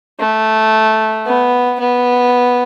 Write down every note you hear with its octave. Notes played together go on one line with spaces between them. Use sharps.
A3
B3
B3